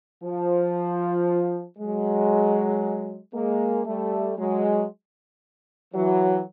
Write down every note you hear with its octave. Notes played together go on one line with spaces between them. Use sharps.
F3
F#3 G#3
G#3 A#3
G3 A3
F#3 G#3
E3 F#3